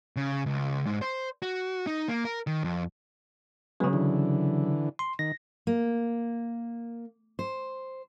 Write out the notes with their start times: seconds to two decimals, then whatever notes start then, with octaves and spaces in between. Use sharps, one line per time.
0.16 C#3
0.46 C#2
0.87 G#2
1.02 C5
1.42 F#4
1.87 D#4
2.08 A#3
2.25 A#4
2.47 D#3
2.63 F2
3.80 C#3 F#3 G#3 B3 C#4
3.93 D3 E3
4.99 C6
5.19 D#3 A#6
5.67 A#3
7.39 C5